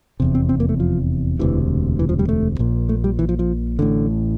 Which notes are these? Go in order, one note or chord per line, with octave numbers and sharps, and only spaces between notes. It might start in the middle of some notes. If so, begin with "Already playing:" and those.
F1 E2 C3
C4
C4
A#3
A3
F3
E1 D2 C3 E3
E3
F3
G3
A3
A#1 A#2
A3
G3
E3
F3
F3
A1 A2 D3